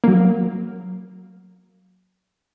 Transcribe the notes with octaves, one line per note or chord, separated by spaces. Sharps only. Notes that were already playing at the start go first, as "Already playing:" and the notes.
F#3 A#3